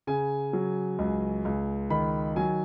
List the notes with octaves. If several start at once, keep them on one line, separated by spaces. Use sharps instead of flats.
C#3 G#5
F#3
C#2
C#2
D#3 B5
F#3 G#5